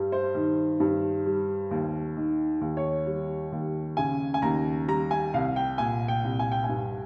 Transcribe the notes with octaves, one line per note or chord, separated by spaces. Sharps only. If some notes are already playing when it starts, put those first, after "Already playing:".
Already playing: G2 G3
C5
D#3
G2
G3
D#2
D#3
D#2
C#5
G3
D#2
C#3 G#5
G#5
D#2 A#5
G3 A#5
G#5
C2 F5
G5
A#2 G#5
G5
C2
G#5
G5
G#5
G2